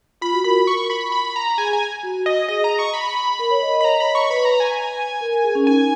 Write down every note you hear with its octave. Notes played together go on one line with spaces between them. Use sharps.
F4 B5
F#4
A#4 B5
C#6
B5
B5
A#5
G#4 G#5
G#5
F#4
D#5
G#4 D#5
A#5
C#6
B5
A#4
C#5
D#5
D#5
B5
C#5 A#5
B5
C#6
B4 B5
A#5
G#5
A#4
A#4
G#4
C#4
D#4 G#5